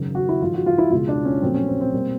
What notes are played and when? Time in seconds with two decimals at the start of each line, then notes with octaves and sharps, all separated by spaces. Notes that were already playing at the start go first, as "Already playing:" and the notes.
Already playing: G#1 F#2 C#3
0.15 F#4
0.29 E4
0.41 G#1 G#2 F3 G#3 F4
0.54 F#4
0.66 F4
0.78 E4
0.91 C#2 B2 G#3 F4
1.08 D4
1.25 C#4
1.42 A#1 A#2 F#3 A3 C4
1.54 C#4
1.68 C4
1.81 C4
1.93 B2 G3 A#3